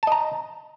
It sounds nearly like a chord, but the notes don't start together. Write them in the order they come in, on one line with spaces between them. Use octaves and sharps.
A5 D#5 A#5